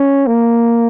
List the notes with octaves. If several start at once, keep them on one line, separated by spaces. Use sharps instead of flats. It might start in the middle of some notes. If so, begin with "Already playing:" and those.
Already playing: C#4
A#3